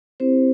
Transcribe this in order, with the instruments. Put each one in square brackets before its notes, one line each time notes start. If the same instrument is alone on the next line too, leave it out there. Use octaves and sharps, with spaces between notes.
[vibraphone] C4 E4 G4 C5